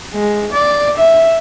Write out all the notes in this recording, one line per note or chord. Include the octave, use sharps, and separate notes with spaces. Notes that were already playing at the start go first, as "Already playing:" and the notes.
G#3
D5
E5